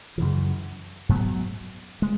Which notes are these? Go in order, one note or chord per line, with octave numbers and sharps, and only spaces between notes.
F#2 C#3 E3
G#2 F#3 B3
G#3